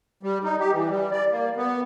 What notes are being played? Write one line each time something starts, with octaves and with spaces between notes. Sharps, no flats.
G3
D#4
G4
E3
G3
D5
A#3
B3